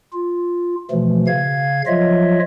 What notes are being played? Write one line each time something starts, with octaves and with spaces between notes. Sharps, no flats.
F4
B2 E3 F3 A3
C#3 F5 G#6
F3 F#3 F4 C#5 D#5 E5